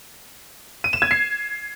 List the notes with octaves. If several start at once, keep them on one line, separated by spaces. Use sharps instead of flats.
D#7
E7
G#6
C7